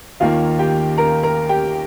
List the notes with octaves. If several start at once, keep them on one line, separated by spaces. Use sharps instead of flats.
D#2 D#3 A#3 F4 F5
G4 G5
A#4 A#5
A#4 A#5
G4 G5